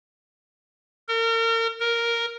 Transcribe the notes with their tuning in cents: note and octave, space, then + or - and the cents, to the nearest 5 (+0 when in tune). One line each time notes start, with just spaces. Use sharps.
A#4 -35
A#4 +0